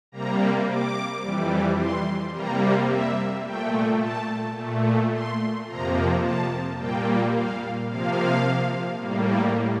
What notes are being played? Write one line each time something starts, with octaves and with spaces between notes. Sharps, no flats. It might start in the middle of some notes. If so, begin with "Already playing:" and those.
C3 G3 A#3 A#5
D6
F2 E3 G3
C6
C3 G3 A#3 A#5
E5
A#2 A3 G5
A5
A#2 A3
C6
F2 C3 F3 A#3 A#5
A5
A#2 G3 A#3 G5
F5
C3 F3 A#3 F5
A2 G3 A#3